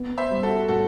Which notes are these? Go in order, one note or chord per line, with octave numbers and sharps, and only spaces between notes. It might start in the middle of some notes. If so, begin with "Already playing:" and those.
Already playing: B3
C5 E5
G3
F#4 A4
A2 F#4 A4